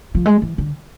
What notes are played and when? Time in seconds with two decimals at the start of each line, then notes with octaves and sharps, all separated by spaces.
0.15 F3
0.26 G#3
0.42 E3
0.58 D3